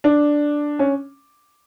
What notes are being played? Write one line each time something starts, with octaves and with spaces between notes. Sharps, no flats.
D4
C#4